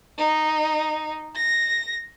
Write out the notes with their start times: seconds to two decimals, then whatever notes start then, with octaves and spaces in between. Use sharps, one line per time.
0.18 D#4
1.35 A#6